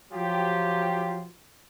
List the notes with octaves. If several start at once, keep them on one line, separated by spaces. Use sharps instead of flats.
F3 F#3 F4 G4